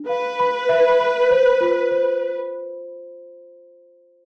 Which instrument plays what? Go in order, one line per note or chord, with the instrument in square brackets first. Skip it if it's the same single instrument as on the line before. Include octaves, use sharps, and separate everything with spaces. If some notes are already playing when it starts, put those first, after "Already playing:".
Already playing: [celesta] D4
[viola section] B4 [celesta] F5
[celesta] B5
E5
B5
C5
F4
C5